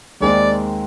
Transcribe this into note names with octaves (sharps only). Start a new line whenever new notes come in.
D#2 D#3 G#3 C4 D5